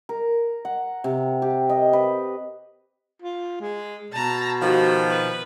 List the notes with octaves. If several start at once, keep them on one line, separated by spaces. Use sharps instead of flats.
A#4
F#5
C3
G4
D#5
B4
F4
G#3
B2 A5 A#5
D#3 F3 F#4 G4
B4